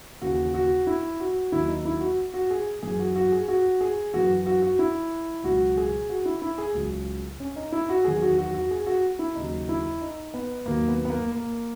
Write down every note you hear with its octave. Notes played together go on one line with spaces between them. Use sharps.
D#2 C#3 E3 F#4
F#4
E4
F#4
D#2 D#3 F#3 E4
D#4
E4
F#4
F#4
G#4
F#2 E3 G#4
F#4
F#4
G#4
F#4
G#4
F#2 E3 F#4
F#4
F#4
E4
C#2 B2 F#3 F#4
G#4
F#4
E4
E4
G#4
C#2 C#3 F#3
C#4
D#4
E4
F#4
E2 D#3 F#3 G#4
F#4
F#4
F#4
G#4
F#4
E4
D#2 C#3 F#3 D#4
E4
D#4
B3
D#2 D#3 F#3 A#3
B3
B3
A#3
A#3